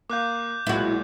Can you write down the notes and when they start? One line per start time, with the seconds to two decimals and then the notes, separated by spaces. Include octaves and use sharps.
0.10 A#3 F5 D6 F#6 G6
0.67 B1 A#2 G#3 E4 F#4